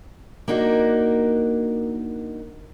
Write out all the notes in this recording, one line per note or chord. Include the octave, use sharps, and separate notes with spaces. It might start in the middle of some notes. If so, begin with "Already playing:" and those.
A#3 D4 D#4 F#4 A#4